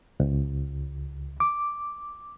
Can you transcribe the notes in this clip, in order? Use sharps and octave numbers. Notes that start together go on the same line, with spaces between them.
C#2
D6